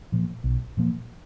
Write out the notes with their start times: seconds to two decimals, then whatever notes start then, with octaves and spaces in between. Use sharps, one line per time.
0.12 A#2 F3 A#3
0.44 B1
0.77 A#2 F3 A#3